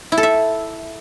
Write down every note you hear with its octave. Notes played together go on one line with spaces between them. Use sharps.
E4
A4
E5